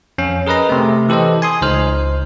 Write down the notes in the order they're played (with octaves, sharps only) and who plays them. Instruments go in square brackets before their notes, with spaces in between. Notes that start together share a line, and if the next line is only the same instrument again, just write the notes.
[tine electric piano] F2 C#4
G#4 A#4 B4 D#5 A#5
C3 A3
E3 G4 A4 C5 D#5
G#5 C6 D#6
C#2 D#4 C5 F6